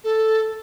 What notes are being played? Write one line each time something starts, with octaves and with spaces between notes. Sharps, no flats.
A4